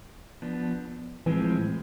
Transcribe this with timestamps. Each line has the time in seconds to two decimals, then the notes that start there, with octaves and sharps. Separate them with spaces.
0.42 F3 B3 D4
1.26 A2 E3 F3 G#3 C4